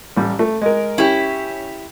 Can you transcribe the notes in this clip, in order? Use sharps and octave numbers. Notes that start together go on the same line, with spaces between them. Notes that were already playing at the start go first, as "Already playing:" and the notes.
A1 G3
A3
G#3 A#4
C#4 E4 G4